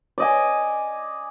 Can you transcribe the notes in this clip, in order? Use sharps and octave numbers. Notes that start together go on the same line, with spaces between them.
D5 D#5 G#5